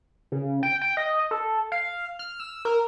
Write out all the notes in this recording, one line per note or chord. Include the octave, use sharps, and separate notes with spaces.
C#3
G5
G5
D#5
A4
F5
F6
E6
A#4